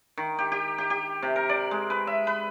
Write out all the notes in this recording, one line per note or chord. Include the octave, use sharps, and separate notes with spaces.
D#3
G4
G4
G4
G4
C3
A#4
D5
G#3
B4
E5
B4